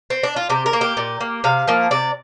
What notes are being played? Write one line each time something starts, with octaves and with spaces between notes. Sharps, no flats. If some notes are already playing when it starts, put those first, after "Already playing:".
C4
D4
F4
C3 G4
A#4
A#3
G4
A#2
A#3
C3 F5
F3 A#3
C3 D5